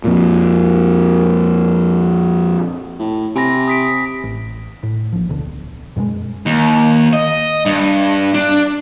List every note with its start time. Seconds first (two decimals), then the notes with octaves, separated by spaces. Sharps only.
0.04 F2 A#2
2.99 A2
3.36 C3 G#5 B5 A#6
3.68 D#6 B6 D7
4.24 A1
4.83 A2
5.12 A#1 F3
5.29 D1 B1 D3
5.96 F#2 B2 F#3 G#3
6.46 D#2
7.13 D#5
7.66 G2
8.34 D4